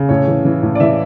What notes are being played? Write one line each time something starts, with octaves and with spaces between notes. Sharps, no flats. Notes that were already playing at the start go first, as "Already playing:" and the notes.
Already playing: C#3
A2 C#5
E3
E3
A2
D5
E3 E5